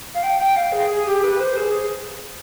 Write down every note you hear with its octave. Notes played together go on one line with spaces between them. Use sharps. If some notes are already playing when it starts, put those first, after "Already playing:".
F5
G5
G5
F5
G#4
G#4
G4
B4
C5
G#4